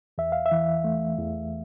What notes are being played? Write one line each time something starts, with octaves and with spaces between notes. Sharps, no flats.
E2 E5
F5
E5
E3
A3
E2